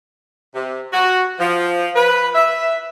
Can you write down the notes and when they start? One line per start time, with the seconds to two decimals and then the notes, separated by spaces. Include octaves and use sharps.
0.55 C3
0.93 F#4
1.39 F3
1.96 B4
2.35 E5